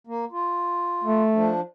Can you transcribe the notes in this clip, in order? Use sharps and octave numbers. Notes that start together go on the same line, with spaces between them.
A#3
F4
A3
F3 D4